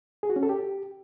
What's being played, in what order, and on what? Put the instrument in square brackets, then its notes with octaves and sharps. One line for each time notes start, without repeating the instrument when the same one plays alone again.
[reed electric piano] G#4
F#4
C#4
A4
G4